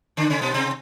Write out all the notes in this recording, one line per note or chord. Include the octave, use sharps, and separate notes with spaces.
D3 D4
C#3 C#4
B2 B3
C3 C4